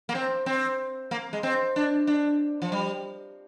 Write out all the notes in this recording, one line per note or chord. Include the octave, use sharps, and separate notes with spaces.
A#3
C4
C4
A#3
G#3
C4
D4
D4
F3
G3